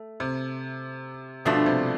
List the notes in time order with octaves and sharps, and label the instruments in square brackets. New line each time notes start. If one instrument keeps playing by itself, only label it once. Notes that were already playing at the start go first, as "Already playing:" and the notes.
Already playing: [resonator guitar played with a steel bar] A3
[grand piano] C3
[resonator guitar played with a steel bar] G2 F3 A3 D4 [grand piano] B2
[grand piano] C3